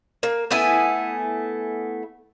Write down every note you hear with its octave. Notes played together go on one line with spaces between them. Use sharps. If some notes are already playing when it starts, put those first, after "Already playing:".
A#3
A3 B3 E4 G#5